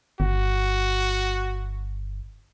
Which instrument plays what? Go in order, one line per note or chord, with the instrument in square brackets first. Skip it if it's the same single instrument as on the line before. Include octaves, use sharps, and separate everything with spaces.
[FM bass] G1 [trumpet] F#4